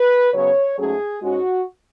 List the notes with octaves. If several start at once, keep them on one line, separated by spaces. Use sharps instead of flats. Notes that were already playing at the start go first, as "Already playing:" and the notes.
Already playing: B4
C#3 F#3 B3 C#5
G#2 F#3 A3 C#4 G#4
G#2 G#3 C#4 F#4